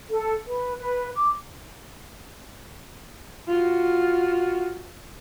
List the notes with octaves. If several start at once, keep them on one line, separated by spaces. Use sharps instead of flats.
A4
B4
B4
D6
F4 F#4